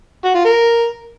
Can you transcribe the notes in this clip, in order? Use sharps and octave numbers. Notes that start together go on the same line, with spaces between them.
F#4
F4
A#4